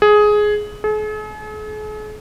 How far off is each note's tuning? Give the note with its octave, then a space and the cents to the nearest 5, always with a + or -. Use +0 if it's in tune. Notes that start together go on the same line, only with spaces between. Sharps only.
G#4 +10
G#4 +45